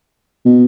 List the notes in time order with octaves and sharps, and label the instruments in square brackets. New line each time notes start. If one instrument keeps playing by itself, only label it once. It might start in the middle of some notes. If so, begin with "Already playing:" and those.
[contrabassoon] B2